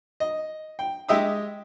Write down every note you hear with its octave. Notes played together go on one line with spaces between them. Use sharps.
D#5
G5
G#3 G4 D#5 E5 D#6 E6